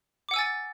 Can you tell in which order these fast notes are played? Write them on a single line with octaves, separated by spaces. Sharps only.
D6 F#5 E6 G#5 A6